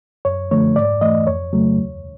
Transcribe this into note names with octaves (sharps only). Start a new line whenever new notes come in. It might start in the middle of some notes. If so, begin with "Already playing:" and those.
F#2 C#5
D3 F3 A3 C#5
G#2 D5
E3 A3 D#5
F2 C#5
C#3 F#3 A3
D#2